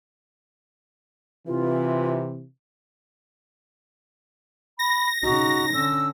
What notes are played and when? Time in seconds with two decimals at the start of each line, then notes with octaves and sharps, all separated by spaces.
1.47 C3 E3 F4
4.79 B5 A#6
5.23 C#3 D#4 F#4
5.74 D3 C#4 E6